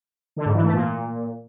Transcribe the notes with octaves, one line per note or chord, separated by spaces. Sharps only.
D3
G#2
E3
A3
A#2